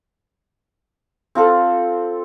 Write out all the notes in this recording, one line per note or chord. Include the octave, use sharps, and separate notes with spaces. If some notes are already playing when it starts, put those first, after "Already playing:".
C4 F4 A4